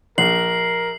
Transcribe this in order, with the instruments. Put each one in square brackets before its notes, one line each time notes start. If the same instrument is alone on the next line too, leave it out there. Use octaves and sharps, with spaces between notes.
[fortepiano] A#1 [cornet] A#4 [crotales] C7 [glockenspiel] F#7